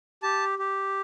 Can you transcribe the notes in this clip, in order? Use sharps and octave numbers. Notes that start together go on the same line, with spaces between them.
G4 A5
G4